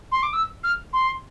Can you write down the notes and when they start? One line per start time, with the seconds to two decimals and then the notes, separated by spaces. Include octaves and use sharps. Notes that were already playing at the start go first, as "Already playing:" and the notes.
0.12 C6
0.23 D6
0.33 E6
0.63 F6
0.93 C6